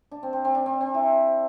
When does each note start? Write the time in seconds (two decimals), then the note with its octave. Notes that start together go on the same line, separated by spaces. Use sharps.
0.11 D4
0.23 C4
0.33 C4
0.45 C4
0.55 D4
0.66 C4
0.81 C4
0.94 E4